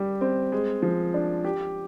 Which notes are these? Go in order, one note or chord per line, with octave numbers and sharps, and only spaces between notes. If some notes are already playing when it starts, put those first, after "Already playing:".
Already playing: G3 G4
C4
G#3
F3
D4
G4